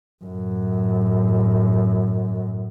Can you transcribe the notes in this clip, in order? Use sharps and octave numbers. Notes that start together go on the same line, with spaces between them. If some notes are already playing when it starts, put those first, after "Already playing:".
F#2 A2